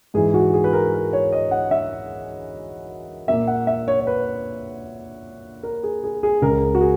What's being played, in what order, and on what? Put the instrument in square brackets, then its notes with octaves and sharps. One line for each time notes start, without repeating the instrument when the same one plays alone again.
[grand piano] G#2 E3 G#3 G#4
F#4
G#4
B4
A#4
A#4
C#5
D#5
F#5
E5
A#2 A#3 E5
F#5
E5
C#5
C#5
B4
A#4
G#4
G#4
G#4
C#2 C#3 G#3 A#4
F#4
G#4